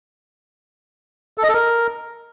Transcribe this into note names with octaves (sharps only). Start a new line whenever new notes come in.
A4
D#5
A4
A#4